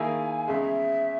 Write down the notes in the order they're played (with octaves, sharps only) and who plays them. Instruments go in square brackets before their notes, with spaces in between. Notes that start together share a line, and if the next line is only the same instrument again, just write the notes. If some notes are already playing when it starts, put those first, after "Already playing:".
Already playing: [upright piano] D#3 A#3 E4 G#4 [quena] G#5
[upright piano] E2 C#3 G#3 [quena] E5
[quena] E5